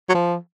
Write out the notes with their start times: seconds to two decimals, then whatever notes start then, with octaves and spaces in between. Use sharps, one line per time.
0.09 F#3
0.15 F3